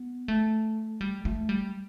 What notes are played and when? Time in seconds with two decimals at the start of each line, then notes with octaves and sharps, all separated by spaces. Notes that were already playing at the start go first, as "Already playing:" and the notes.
Already playing: B3
0.28 A3
1.01 G3
1.25 A3
1.49 G3